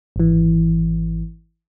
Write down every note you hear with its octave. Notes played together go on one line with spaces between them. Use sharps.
G#1 E3